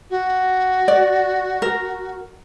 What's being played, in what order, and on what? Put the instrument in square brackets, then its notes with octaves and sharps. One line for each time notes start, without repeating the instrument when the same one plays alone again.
[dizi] F#4
[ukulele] D5
A#4